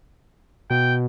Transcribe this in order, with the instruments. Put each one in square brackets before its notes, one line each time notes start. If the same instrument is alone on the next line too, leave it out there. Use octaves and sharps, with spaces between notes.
[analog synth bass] B2 [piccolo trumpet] G5